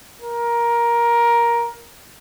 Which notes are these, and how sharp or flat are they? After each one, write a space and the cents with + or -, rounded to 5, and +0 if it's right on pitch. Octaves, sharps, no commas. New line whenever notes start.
A#4 +15